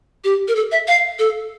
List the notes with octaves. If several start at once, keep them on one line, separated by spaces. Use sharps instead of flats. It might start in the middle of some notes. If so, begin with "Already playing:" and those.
G4
A#4
A4
E5
F5
A4